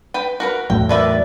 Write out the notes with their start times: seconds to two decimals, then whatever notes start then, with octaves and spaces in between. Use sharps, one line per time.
0.14 B4 G5
0.40 F#4 A#4 B4
0.70 E2 A2 F#3 G5
0.89 D#3 B4 D5 E5